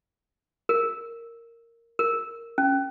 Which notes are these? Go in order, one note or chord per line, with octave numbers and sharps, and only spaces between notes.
A#4
A#4
C#4